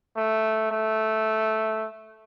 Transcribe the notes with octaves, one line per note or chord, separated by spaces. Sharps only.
A3
A3